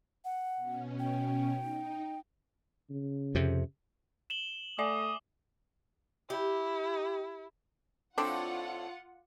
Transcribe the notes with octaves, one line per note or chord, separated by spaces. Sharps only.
F#5
B2 C#4
G5
D#4
C#3
F2 C3
E7 F#7 G7
A3 D5 E5 G#5 D6 D#6
E4 G4
A2 C4 D4 F4 A4 F#5 D6